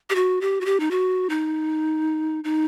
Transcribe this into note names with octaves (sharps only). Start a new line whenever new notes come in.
G4
F#4
G4
F#4
G4
D#4
F#4
D#4
D#4